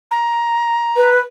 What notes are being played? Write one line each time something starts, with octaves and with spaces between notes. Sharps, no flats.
A#5
B4